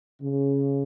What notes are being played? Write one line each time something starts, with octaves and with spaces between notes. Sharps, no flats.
C#3